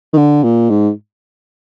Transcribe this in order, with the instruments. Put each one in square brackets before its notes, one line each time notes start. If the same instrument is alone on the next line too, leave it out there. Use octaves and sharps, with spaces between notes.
[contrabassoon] D#3
D3
A#2
G#2